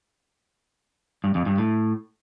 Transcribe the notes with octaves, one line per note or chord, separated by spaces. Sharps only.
G2
F2
G2
A2